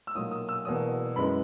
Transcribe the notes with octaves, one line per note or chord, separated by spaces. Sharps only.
E6
B1 A#2 F#3 A#3 D#6
D#6
E6
E1 E2 B2 A#3 D#6
F#2 E3 G#3 B3 B5